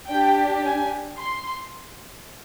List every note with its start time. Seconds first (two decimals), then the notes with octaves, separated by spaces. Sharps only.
0.10 D4 G4 G5
0.65 G#5
1.19 C6